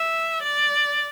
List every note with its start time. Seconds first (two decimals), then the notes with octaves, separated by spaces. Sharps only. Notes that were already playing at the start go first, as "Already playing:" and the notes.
Already playing: E5
0.43 D5